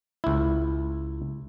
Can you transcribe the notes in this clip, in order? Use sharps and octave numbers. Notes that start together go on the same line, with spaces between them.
C#2 E4